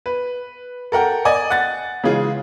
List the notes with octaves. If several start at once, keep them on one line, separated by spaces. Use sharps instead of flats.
B4
A4 A#4 F#5 G5
D5 D#5 G#5
F#5 F#6 A6
C#3 E3 G#3 F4 G#4